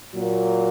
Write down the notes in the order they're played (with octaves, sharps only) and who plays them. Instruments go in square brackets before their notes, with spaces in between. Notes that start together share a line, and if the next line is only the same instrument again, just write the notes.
[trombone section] A#2 F#3 A#3